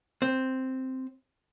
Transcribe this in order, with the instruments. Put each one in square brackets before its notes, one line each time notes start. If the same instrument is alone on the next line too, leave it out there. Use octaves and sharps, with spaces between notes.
[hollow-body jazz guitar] C4